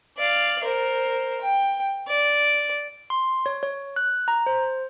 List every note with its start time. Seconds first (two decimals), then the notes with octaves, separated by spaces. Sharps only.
0.18 D5 F5
0.63 A#4 C5
1.42 G5
2.08 D5
3.10 C6
3.46 C#5
3.63 C#5
3.96 F#6
4.28 A#5
4.46 C5